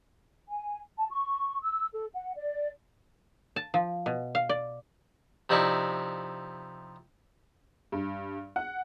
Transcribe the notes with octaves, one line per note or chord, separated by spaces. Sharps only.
G#5
A5
C#6
E6
A4
F#5
D5
A5
F3
B2
F5
D5
C3 F3 D#4 E4 D5 C#6
G2
F#5